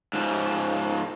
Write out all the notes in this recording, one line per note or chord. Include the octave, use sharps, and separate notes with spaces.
G#2 F3